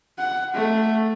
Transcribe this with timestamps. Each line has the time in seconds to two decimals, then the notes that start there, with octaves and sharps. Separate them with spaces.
0.18 F#5
0.54 A3